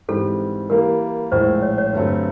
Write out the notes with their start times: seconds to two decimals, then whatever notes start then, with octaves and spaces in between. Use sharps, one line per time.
0.08 G#2 E3 G3 C4 A4
0.70 E3 G3 A#3 A#4
1.32 A#1 A2 F3 G#3 C5
1.62 C#5
1.78 C#5
1.93 G2 D3 F#3 A3 C4